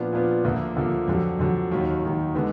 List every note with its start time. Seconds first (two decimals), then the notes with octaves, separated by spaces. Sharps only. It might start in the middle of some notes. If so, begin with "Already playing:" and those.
Already playing: A#2 F3 B3 D4 F4
0.12 A#2 F3 B3 D4 F4
0.44 D2 D3 F3 A#3
0.76 D2 D3 F3 A#3
1.08 F2 D3 F#3
1.39 F2 D3 F#3
1.72 D#2 D#3 F#3
2.03 D#2 D#3 F#3
2.34 D3 G#3 B3 D#4